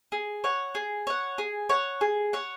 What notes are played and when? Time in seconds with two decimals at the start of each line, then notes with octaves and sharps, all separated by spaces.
0.12 G#4
0.44 C#5 F#5
0.75 G#4
1.07 C#5 F#5
1.38 G#4
1.69 C#5 F#5
2.01 G#4
2.33 C#5 F#5